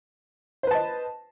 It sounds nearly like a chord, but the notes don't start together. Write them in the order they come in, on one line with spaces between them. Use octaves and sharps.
C5 B4 A5 D#5